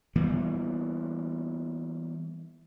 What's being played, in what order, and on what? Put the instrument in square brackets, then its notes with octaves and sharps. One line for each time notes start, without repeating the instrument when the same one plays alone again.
[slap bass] E3 G3 A#3 B3